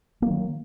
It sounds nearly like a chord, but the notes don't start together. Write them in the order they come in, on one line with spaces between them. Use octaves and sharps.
A#3 F#3 D#3